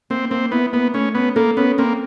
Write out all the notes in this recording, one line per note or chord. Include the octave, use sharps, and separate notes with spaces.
A#3 C4
A#3 C4
B3 E4
A#3 B3
A3 C#4
B3 C#4
A#3 A4
B3 C#4
A#3 C4